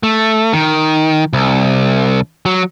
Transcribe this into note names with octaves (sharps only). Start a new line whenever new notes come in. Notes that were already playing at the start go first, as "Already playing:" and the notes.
A3
D#3
C2
F#3